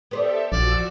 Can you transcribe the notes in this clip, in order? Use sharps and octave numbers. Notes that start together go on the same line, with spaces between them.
B3 G4 A4 C5 D5 E5
A#1 E2 F3 F#4 D5 F5 E6